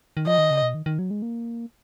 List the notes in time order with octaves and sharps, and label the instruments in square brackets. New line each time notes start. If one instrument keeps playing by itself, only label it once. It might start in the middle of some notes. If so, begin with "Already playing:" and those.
[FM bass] D#3
[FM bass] F3 [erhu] D#5
[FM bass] D#3
C#3
B2
D#3
D#3
F#3
G#3
A#3